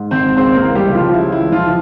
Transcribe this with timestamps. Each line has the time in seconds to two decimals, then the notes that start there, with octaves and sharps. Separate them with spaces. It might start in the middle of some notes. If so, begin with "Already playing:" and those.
Already playing: G#2
0.11 G#1 C4 C5
0.37 C#2 C4 C5
0.56 A#3 A#4
0.63 E3
0.75 G3 G4
0.88 C#3
0.94 F3 F4
1.13 C#2 E4
1.32 E4
1.39 E3
1.52 F3 F4
1.65 E3